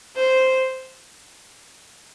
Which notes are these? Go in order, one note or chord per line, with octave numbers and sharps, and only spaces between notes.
C5